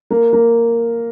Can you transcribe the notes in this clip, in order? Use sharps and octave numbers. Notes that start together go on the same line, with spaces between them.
A#3
A#3